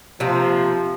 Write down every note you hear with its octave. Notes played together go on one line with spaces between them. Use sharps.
C3 F3 A#3 F4